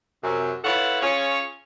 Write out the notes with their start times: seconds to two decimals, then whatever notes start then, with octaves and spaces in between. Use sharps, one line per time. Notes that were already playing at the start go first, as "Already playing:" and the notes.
0.23 F#2 C3
0.64 E4 F4 A4 B4 C#5 F#5
1.01 C#4 F4 G#4 C#5